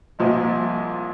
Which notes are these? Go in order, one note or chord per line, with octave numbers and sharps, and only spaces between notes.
C2 A#2 F3 G#3